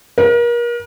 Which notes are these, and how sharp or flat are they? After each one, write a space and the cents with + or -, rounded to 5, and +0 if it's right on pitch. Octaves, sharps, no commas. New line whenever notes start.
A#4 +35